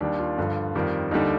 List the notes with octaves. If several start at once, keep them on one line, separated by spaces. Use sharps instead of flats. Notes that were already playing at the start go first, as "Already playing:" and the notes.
D#2 D#3 G3 D4
F4
G2 D3 F3
F2 D#3 G3
D#2 D3 G3 D#4